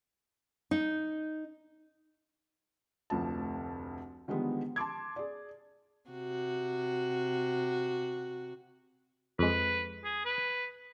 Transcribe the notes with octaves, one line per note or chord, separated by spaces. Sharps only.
D#4
F1 D2 F3 A5
D3 D#3 F3 G3 G#3 B3
A5 C6 D6 G#6
G#4 D5
C3 F#4
F2 G#3 B4
G#4
B4